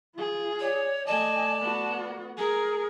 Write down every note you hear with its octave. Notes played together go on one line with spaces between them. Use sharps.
F4 G#4
C#5 D5
A3 D5 D#5 G#5 A5
B3 F#4
G#4 A#4 G#5